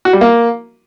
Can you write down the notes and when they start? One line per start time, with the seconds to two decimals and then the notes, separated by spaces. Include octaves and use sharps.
0.05 F#4
0.13 G3
0.21 A#3